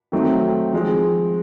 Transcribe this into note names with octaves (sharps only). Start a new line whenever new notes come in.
D#3 F#3 A3 C4 D#4
F3 G#3 C4